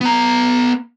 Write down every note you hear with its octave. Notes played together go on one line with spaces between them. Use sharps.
B3 A#5